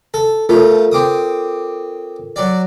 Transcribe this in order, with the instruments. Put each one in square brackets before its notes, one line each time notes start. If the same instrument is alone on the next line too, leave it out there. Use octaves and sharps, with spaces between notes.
[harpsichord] A4
[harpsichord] F3 A3 [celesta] F4 A4 A#4
[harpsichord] C4 D6 D#6
F#3 D5